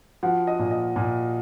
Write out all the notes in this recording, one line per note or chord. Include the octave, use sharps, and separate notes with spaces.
F3 F#4
D#5
A#2
D#5
A#2